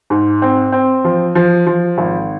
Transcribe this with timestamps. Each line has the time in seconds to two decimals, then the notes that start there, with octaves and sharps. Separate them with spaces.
0.10 G#2
0.42 C4
0.72 C4
1.04 F3
1.35 F3
1.67 F3
1.98 G#1